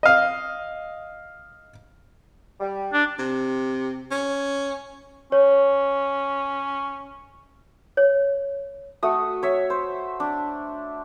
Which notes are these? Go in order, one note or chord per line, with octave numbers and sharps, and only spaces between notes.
D#5 F5
G3
D4
C3
C#4
C#4 C#5
C#5
A3 F#4 D#6
C#5 E5
C5
D4